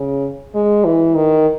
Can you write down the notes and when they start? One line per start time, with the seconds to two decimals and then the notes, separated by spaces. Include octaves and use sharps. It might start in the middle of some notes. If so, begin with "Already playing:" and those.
Already playing: C#3
0.54 G#3
0.85 E3
1.15 D#3